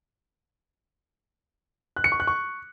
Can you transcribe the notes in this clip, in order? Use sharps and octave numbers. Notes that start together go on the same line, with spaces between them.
F#6
C#7
C#6
F#6
C#6